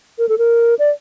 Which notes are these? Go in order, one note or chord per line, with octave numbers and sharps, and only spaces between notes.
A#4
A4
A#4
D5